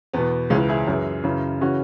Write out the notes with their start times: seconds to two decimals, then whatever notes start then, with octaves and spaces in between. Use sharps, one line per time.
0.13 E2 B2 B3
0.50 C#2 C#3 E3 G#3 C#4
0.69 E4 G#4
0.88 F#2 E3
1.24 F#2 C#3 E3
1.61 C#3 E3 C#4 F#4